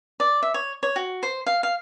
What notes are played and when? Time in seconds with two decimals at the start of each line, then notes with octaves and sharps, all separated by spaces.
0.20 D5
0.43 E5
0.54 C#5
0.83 C#5
0.96 F#4
1.23 C5
1.46 F5
1.63 F5